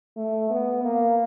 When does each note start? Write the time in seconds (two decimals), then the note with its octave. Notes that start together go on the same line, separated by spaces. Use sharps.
0.17 A3
0.50 B3
0.84 A#3